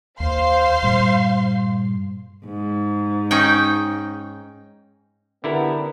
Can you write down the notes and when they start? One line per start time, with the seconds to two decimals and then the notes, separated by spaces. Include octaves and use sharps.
0.20 D#2 C5 F5 C6
0.83 G2 A#2 G3
2.45 G#2
3.31 C#4 D#4 G5
5.44 D3 B3 E4 G4 A#4